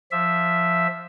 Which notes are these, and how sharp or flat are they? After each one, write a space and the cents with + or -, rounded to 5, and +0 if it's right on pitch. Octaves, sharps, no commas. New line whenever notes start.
F3 +0 E5 +0